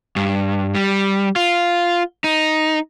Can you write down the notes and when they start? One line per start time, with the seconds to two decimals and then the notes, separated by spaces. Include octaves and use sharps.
0.16 G2
0.75 G3
1.36 F4
2.24 D#4